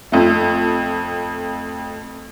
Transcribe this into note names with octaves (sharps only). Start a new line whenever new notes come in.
F2 A3